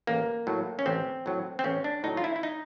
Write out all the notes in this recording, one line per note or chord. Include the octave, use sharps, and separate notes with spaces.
A1 A#3
A2 F#3
C#4
A1 C4
A2 F#3
C4
A1 C#4
D4
A2 F#3 D#4
F4
E4
E4
D#4